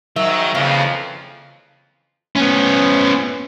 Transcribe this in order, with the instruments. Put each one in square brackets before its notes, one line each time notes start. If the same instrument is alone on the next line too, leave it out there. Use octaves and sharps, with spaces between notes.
[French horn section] G#2 D#3 [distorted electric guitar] F#3 [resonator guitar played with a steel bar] E5
[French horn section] F2 [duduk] C#3 [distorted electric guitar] E3 F4 [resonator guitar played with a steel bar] A#3
[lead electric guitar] B3 C#4